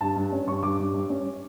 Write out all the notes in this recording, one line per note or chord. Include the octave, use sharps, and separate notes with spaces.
G2 A5
G2
C#4
G2 C#6
G2 D6
G2
G2
C#4